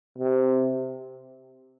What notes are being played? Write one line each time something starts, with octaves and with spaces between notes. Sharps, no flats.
C3